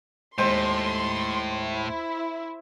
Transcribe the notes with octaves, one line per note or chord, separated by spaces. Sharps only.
D#2 A2 G#3 C5 C6
E4